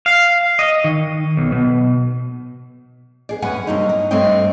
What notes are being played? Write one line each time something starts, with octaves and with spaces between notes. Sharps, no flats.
F5
D#5
D#3
B1
B2
B3 G#4 D5
F#2 B3 B4 F#5 G#5
G2 C3 F#3 A#3 D#4
D#4
G2 A3 C4 C#5 D#5 G5